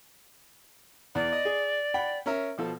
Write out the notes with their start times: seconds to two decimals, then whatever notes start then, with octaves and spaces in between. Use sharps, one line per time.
1.15 E2 D5
1.32 D#5
1.45 G#4
1.94 F#5 G5 B5
2.26 C#4 A#4 E5
2.58 B2 F3 A4